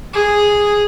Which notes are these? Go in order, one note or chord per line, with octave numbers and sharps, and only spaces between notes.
G#4